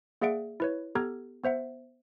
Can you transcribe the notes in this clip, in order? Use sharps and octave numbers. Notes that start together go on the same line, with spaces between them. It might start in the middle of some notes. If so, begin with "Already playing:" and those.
A#3 G#4 D5 E5 F#5 D7
E4 B4 C#5
B3 G4 A4 A#5 F6 G#6
B3 C5 E5 F#5